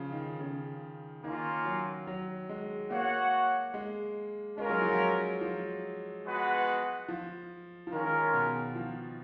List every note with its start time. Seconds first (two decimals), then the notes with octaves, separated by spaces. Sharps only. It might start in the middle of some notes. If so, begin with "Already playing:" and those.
Already playing: C#3 F3
0.12 D#3
0.40 C#3
1.24 D#3 A#3 C#4 F4
1.65 F#3
2.07 F#3
2.49 G#3
2.90 A#3 F#4 C#5 F#5
3.74 G#3
4.58 G#3 C#4 F4 A#4
4.69 F#3
4.82 F3
4.93 F#3
5.41 F3
6.25 G#3 B3 F#4 B4 F#5
7.08 F3
7.87 F3
7.91 D#3 G#3 C#4 F4 A#4
8.34 B2
8.75 F3